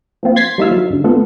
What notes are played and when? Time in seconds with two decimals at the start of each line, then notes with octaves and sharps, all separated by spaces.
0.23 F3 A#3 C4 F4
0.36 C6 G#6 A6 B6 C7
0.58 G3 A#3 D#4 E4 E5 F5
0.71 F#3
0.90 G2 D3
1.04 A3 B3 C4 F4 A4